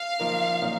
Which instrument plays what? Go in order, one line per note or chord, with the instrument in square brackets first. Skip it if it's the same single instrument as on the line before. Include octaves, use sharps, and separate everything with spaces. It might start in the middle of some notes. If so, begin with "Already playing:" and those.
Already playing: [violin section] F5
[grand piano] F3 A#3 D#4 A#4
A#2 F#3 A#3 D#4